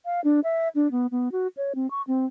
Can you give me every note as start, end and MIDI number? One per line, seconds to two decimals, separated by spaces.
0.05 0.21 77
0.24 0.40 62
0.44 0.68 76
0.75 0.90 62
0.92 1.07 59
1.11 1.32 59
1.32 1.48 66
1.57 1.73 73
1.75 1.89 60
1.91 2.02 85
2.08 2.26 60